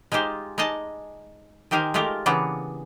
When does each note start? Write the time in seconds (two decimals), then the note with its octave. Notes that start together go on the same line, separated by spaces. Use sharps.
0.12 G#3 D#4 F4 G4 C5
0.58 G#3 D#4 D5 D#5 A5
1.71 D#3 D#4 G4 A#4 C5 G#5
1.94 G#3 A3 F4 G4 A#4
2.26 C#3 E3 A#3 B3 D4